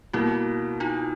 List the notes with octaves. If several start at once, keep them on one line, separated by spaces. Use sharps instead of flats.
B2 G3 A#3 E4 F#4
D#4 F4